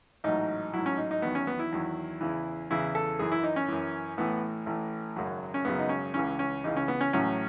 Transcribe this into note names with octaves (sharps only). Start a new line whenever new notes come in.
A1 G#2 F#3 D#4
A1 G#2 F#3 E4
C#4
D#4
D#4
E2 D#3 F#3 B3
C#4
B3
E4
E2 D#3 F#3
E2 C#3 E3
E2 C#3 E3 E4
A4
F#2 E3 G#4
E4
D#4
C#4
F#2 E3
A1 A2 E3 B3
A1 A2 E3
G#1 F#2 C#3 F#3
C#4
G#1 F#2 C#3 F#3 B3
D#4
C#4
C#2 C#3 E3 C#4
C#4
C#2 C#3 E3 D#4
C#4
B3
C#4
A1 A2 F#3 C#4